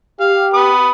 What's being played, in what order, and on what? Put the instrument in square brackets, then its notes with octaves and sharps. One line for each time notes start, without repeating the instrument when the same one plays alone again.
[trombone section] G4 [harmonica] F5
[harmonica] B4 D#6